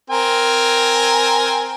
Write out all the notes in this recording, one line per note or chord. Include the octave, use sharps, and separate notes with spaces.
C4 A#4 G#5